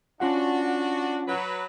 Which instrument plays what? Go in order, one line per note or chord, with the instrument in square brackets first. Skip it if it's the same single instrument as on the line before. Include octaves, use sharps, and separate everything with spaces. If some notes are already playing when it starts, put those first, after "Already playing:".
[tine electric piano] C#4 F4 F#5 [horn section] D4 F#4
[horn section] F#3 B4